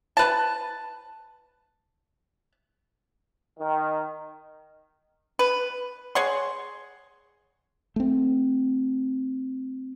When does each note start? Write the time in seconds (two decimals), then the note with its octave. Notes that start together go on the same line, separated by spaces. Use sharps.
0.17 B4 A5
3.60 D#3
5.39 B4
6.15 G#4 C#5 F#5 C6
7.96 A3 C4